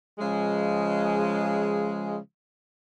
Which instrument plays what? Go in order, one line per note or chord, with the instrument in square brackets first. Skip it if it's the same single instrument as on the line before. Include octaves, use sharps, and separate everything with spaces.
[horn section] C#3 F3 G#3